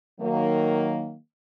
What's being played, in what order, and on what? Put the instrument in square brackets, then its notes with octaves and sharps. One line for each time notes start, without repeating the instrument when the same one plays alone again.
[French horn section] D#3 F#3 A#3